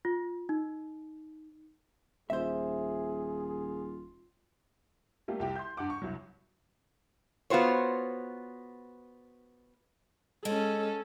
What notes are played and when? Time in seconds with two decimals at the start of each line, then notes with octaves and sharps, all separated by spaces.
0.05 F4
0.49 D#4
2.30 D#1 F4 G#4 C5 E5
5.28 G3 A3 A#3 G4
5.40 C2 G4 G5
5.56 C6 G6
5.77 G2 F#5 D6
5.90 C#6
6.02 C2 F#3
7.50 B3 F4 F#4 C5 C#5
10.45 G#3 C#4 A4